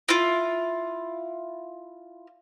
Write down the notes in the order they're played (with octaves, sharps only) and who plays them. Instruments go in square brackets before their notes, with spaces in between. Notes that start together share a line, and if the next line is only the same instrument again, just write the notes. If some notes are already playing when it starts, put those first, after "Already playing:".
[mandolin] E4 F4